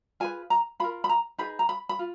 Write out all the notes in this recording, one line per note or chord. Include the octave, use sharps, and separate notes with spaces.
F4 G#4 B4 G#5
A#5
F4 A#4 B5
B5
A#5
D#4 G#4 B4 B5
A#5
B5
B5
F4